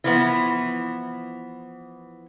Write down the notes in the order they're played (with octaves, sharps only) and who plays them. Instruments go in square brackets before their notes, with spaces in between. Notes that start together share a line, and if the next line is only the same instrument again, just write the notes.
[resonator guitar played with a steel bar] E3 F3 B3